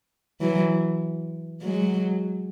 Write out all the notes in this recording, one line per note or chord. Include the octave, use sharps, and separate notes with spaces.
E3 F#3
F#3 G#3